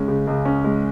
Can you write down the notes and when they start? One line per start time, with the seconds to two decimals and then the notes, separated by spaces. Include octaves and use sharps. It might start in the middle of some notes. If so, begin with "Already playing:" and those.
Already playing: C#2 G#3 C#4
0.08 C#3
0.27 C#2
0.45 C#4
0.64 G#3